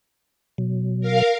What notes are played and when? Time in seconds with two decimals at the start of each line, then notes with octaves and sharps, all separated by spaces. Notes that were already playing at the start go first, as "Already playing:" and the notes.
0.58 B2 F#3
1.01 A#4 F5